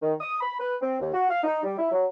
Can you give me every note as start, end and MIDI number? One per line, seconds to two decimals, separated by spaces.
0.01 0.13 51
0.21 0.37 87
0.41 0.59 83
0.59 0.74 71
0.82 1.00 60
1.00 1.11 39
1.13 1.27 66
1.30 1.44 77
1.44 1.61 63
1.63 1.76 55
1.78 1.87 64
1.92 2.06 54